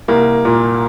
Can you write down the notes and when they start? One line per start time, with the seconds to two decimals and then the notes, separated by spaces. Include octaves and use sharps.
0.08 C2 A#3
0.45 A#2